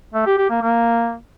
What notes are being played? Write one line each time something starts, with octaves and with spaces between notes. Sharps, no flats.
A3
G4
G4
A#3
A#3